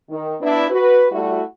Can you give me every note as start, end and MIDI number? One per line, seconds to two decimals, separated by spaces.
0.10 0.35 51
0.41 0.66 59
0.41 0.66 62
0.41 0.66 64
0.71 1.06 66
0.71 1.06 71
1.12 1.42 55
1.12 1.42 57
1.12 1.42 64
1.12 1.42 66